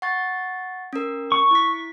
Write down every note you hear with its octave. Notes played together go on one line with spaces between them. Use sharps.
F#5 C#6 A6
C#4 A#4
C#6
E4 B6